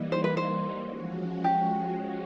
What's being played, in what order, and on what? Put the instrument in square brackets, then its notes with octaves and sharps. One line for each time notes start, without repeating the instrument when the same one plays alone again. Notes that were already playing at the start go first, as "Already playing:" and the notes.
Already playing: [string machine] E3 G3 A#3 D#4
[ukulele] C5
B4
C5
[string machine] F3 G#3 C#4 F#4
[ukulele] G4